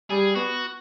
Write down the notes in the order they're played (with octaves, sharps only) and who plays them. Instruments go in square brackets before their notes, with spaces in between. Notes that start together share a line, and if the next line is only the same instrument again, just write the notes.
[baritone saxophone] G3 [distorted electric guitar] G#4
[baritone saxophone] B3 [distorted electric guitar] F#4